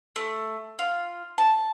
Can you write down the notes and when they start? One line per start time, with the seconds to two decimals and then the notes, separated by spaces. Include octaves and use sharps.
0.16 A3
0.79 F4
1.38 A5